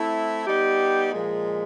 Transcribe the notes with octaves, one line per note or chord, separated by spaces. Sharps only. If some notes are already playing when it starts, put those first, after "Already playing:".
Already playing: A3 C4 E4
G3 B3 D#4 G4
A#2 F3 G#3